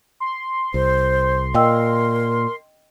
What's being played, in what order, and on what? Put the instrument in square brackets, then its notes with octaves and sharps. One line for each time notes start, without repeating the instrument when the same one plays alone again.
[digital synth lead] C6
[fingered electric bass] C2 [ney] C5
[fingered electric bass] A#2 [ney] A#4 [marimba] D#5 G5 E6